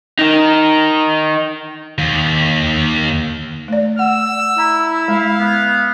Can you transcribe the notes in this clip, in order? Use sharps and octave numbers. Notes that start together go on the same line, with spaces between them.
D#3 D#4
D#2
A3 D5
F#5 E6
E4 A#5
G#3 F5
B3